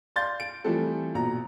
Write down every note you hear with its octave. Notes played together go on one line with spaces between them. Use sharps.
D5 F5 C6 G6 A6
D7
E3 F3 G3 A3 C4 A4
A#1 B2 A#5